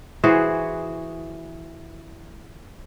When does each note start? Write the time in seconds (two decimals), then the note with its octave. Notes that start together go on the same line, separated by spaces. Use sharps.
0.23 E3 F#4 G#4 C5